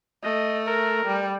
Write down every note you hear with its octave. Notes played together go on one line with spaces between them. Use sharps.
A3 D#5
A#4
G3